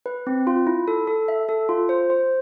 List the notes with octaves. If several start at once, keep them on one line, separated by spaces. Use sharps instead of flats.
B4
C4
F4
E4
A4
A4
E5
A4
F4
C5
C5